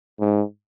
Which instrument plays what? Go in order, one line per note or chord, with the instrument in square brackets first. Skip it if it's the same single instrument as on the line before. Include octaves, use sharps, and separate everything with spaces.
[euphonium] G#2